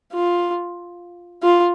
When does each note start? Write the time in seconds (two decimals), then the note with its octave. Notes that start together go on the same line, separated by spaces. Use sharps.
0.13 F4
1.43 F4